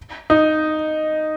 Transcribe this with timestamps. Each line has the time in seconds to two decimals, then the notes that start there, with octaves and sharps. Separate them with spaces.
0.30 D#4